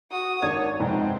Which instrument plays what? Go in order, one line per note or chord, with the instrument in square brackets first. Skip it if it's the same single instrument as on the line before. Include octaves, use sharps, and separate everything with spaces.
[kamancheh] F#4 D#6
[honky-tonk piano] G#1 D4 G#6 [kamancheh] C#5
[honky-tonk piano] F2 G#2 C3 [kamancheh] B3 C4